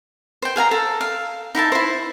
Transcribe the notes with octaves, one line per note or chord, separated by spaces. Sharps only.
C5 G5
G#4 F5 G#5 A#5
A4
F5
D#4 E4 E5 A5
E4 C5